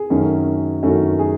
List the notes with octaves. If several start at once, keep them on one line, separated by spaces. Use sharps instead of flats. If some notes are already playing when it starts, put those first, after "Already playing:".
Already playing: G#4
F#2 D#3 A3 C#4
F#2 D#3 A3 C#4 F#4
G#4